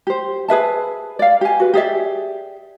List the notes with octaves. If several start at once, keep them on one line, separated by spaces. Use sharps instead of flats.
G4 C5
G#4 B4 E5 A5
D5 F5
G4 G#5
F#4 B4
G4 G#4 D5 E5